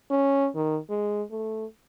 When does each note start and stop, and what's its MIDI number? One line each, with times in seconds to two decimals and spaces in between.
0.11 0.49 61
0.55 0.78 51
0.90 1.23 56
1.31 1.65 57